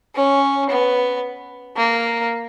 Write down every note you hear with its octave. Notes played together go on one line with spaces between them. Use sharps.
C#4
B3
A#3